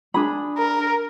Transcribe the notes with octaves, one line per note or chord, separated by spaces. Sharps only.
D4 G#4 B5
A#4